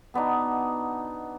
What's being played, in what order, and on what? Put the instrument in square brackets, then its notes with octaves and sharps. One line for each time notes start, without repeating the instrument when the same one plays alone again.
[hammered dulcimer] B2 B3 D4 D#4